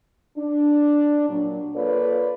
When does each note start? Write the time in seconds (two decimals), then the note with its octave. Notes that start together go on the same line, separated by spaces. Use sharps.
0.37 D4
1.30 A#2 F#3
1.75 A#3 F4 A4 B4 C#5 D5